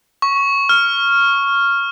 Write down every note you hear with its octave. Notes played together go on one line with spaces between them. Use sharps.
C#6
F6